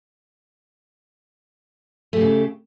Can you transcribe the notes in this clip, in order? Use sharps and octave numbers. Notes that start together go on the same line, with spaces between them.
C#3 A3 G4